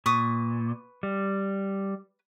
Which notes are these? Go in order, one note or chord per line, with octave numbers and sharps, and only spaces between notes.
A#2 B4 C#6 D#6
G3